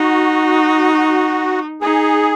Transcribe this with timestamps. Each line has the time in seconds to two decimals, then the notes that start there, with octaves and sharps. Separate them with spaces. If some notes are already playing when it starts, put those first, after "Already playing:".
Already playing: D#4 F#4
1.81 D#4 G#4